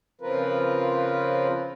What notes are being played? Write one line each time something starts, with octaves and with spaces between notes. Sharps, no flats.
C#3 F3 C4 F4 A#4 B4